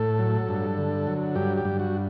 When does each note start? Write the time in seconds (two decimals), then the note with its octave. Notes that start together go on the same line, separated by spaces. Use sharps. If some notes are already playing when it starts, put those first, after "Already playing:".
Already playing: A2 A4
0.19 F#3
0.49 G2
0.78 D3
1.07 F#3
1.35 G2 G4
1.57 G4
1.65 G2
1.80 F#4